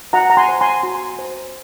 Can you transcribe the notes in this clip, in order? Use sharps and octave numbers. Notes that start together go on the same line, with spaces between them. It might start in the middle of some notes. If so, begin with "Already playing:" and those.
F#4 F#5 A#5
A#5
G#5 C6
C5
G#5 C6
F#4
C5